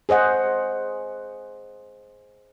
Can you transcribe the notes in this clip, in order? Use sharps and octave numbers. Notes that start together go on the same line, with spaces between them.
G#4 C5 D#5 F#5